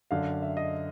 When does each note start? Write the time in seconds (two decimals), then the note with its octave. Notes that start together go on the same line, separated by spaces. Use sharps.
0.11 F#2 D3 F5
0.42 E5
0.57 D#5